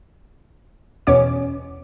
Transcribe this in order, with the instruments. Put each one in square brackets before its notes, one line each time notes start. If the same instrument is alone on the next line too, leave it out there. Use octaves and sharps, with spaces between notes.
[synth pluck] E2 B2 C#4 C#5 D6